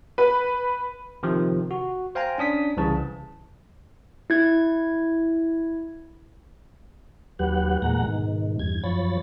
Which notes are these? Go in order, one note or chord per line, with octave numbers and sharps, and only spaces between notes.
B4
C3 D#3 F3
F#4
C5 F5 G5 G#5 A#5
C#4 D4 D#6 B6
C2 C#3 E3 A5
E4 G#6
D#2 F#3 G4 B4 F#5
E2 A#2 G#3 F#5 A#5
G#2 B2 D#3
E2 G2 G#6
F#2 F3 C#5 B5 A6